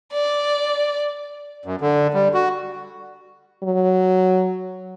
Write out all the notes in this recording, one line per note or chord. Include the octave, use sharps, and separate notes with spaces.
D5
F#2
D3
G3
F#4
F#3